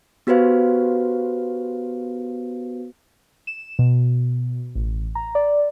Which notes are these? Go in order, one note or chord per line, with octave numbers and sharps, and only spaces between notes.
B3 F#4 G4 B4 C5 F5
E7
B2
A1
A#5
D5